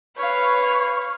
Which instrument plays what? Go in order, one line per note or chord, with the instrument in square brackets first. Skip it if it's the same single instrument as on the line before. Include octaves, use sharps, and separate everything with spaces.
[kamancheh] B4 F5 [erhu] C#5